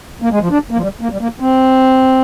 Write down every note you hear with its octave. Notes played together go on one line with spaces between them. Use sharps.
A#3
G#3
F3
D4
A#3
F3
G3
A#3
G3
A#3
C4